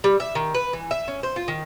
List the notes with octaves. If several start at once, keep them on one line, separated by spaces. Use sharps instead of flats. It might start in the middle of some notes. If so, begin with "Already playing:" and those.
G3
E5
D#3
B4
E3
E5
C#4
C5
F4
D#3